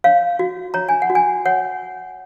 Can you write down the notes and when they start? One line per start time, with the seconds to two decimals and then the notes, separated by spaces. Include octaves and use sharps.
0.04 C#5 F5
0.39 F#4
0.74 C#5 A#5
0.89 G#5
1.02 F#5
1.10 F#4
1.15 G#5
1.45 C#5 F#5